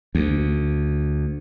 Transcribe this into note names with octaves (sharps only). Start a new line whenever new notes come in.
D2